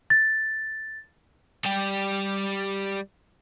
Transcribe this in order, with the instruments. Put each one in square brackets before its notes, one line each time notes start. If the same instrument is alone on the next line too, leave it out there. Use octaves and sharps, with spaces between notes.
[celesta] A6
[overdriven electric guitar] G3 G4